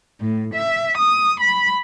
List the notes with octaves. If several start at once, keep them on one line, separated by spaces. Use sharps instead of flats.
A2
E5
D#6
B5